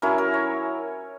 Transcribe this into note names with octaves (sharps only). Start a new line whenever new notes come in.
F#3 C#4 E4 A#4
A#4
C#5